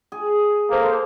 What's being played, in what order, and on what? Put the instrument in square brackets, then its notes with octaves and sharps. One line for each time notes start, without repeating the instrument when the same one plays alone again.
[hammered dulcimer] G#4
[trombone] A#3 [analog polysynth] A4 C5